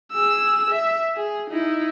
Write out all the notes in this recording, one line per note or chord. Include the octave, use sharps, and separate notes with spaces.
G#4 E6
E5
G#4
D#4 E4